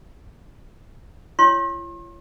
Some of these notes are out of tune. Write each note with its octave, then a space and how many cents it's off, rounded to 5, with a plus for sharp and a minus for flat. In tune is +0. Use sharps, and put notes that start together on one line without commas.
F4 -45 C#5 +0 C6 +40